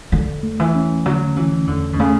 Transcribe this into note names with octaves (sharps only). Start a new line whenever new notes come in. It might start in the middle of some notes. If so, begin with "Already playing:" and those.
E2 D3
A3
E3
C#4
D3 F#3
E3 C#4
E2 D3
B2
C#3 A3